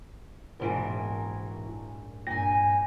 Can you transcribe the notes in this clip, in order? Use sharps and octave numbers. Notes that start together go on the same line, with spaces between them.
A#1 G#2 B2 E3 A#4 D7
G2 A#2 G5 G#5 A#6